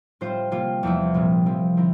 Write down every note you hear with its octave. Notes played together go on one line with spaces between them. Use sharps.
A2 G3 C4 F4 C5
C3 G3 A#3 F4
E2 C3 F3 A3 E4
C2 A#2 G3
F3 C4 E4
D3 F3 C4 E4 A#4